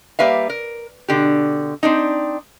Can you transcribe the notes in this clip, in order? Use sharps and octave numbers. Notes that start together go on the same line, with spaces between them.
G3 A#3 B4 E5 F5
A#4
B2 D3 G4
C4 D4 D#4